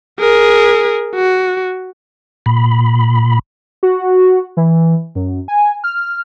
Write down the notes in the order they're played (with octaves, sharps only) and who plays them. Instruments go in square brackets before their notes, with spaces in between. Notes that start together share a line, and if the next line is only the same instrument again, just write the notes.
[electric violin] G#4 A#4
F#4
[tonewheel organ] A#2 B5
[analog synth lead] F#4
E3
F#2
G#5
F6